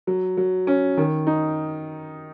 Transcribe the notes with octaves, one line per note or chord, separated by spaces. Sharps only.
F#3
F#3
C#4
D#3
D#4